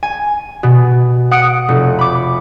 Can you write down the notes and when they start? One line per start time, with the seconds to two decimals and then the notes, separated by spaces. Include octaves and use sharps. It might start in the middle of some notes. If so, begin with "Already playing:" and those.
0.03 G#5
0.63 B2
1.31 F#5 D#6 C#7 D7
1.68 F1
1.99 B5 D6